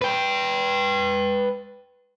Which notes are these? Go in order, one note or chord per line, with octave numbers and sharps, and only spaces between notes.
B4 G5